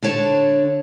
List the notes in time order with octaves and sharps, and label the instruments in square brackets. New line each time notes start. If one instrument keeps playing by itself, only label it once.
[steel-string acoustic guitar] D3 D4 C#5 A5